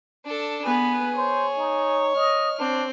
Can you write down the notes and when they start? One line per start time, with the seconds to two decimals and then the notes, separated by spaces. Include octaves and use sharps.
0.25 D4 A4
0.64 B3 G#4 B4
1.16 C5 C#5
1.57 D#4
2.16 D#5 F6
2.58 C4 D4